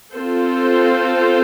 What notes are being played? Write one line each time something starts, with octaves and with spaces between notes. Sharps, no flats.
C4 F4 A4 C5